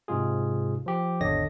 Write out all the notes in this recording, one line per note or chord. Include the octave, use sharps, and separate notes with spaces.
G#2 C3 G#3 F4 G#4
F3 G4
G#1 E2 D3 C#5 D#5 A#6